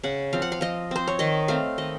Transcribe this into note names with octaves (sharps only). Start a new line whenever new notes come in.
C#3 F#5
F3 C4 F5
F#5
F5
F3 D#5
C4 C5
C#5
D#3 D#5
A3 C4 F5
D#3 D#5